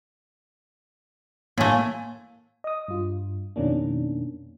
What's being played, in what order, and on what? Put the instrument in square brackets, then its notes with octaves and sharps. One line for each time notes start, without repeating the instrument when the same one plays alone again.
[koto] A2 A3 [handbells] A#3 G#5
[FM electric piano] D#5 D#6
G2 F4
F2 B2 D#3 A#3 C#4 D4